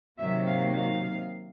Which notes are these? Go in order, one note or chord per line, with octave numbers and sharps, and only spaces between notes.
C3 D#3 F#3 A#3 E5
F5
F5